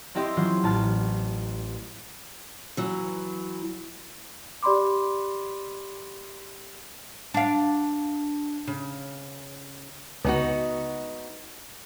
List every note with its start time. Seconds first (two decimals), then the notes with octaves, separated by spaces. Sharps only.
0.15 C4 E4 G4 D#5 E5 C6
0.37 E3 F#3 C#4 F4 C5
0.64 A1 A5 F6 A6
2.77 E3 F#3
4.63 G4 D5 B5 C6 D6
7.34 D4 F5
8.67 C#3
10.25 C#2 B3 D#4 F#4